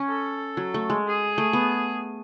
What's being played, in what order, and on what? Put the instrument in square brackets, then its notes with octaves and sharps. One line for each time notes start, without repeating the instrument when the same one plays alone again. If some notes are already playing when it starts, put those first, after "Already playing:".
Already playing: [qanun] C#4
[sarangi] A4
[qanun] F#3
A3
G#3
[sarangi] G#4
[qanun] A3
B3